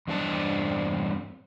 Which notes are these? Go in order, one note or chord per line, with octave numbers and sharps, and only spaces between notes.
E2 G2 C4 D4 E4 A5